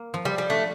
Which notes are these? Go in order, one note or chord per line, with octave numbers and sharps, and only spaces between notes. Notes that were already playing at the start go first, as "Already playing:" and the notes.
Already playing: A#3
F3
G3
G3
A3 D4